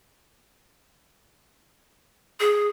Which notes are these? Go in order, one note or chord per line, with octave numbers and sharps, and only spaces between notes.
G#4